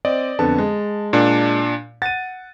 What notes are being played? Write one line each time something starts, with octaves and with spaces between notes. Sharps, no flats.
C4 D5 D#5
F2 D3 B3 A5
G#3
A#2 D4
F#5 A6 D#7